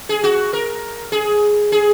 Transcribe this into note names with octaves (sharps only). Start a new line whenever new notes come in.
G#4
F#4
A#4
G#4
G#4